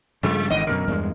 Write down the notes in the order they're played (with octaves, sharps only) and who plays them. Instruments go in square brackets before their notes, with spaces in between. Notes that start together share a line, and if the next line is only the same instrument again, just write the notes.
[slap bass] G2 C#3 F3 [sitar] G#3
[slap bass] G#1 D3 D#3 [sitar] E2 D#5
[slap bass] F#2 B2 D3 [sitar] A#4
[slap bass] E2 G2 G#3